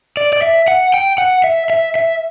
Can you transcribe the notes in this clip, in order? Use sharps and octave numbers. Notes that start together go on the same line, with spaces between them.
D5
D5
E5
F#5
G5
F#5
E5
E5
E5